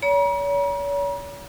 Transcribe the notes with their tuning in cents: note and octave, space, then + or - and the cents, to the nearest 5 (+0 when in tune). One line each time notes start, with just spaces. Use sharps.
C#5 +40 A#5 +45